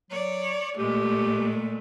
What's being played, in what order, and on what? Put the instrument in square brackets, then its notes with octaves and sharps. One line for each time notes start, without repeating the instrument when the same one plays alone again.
[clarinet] F#3 [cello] C#5 D5
[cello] A#2 G#3 [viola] A3 [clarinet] G4